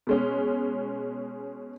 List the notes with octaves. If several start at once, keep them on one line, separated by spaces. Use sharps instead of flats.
B2 G#3 C#4